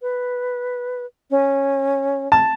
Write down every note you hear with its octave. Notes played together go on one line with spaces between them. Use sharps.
B4
C#4
A5